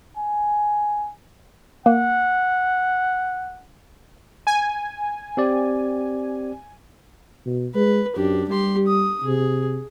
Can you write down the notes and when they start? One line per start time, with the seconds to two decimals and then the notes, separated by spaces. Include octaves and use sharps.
0.17 G#5
1.86 A#3 F#5
4.47 G#5
5.37 C4 G4 D5
7.46 B2
7.75 G#3 B4
8.16 F#2 D4 G4
8.49 G3 G4 C6
8.87 D#6
9.24 C3 G#4